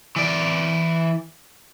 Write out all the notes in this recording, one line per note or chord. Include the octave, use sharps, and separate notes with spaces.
E3 D5